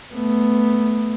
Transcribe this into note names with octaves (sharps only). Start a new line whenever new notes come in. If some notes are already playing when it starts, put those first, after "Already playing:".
A3 B3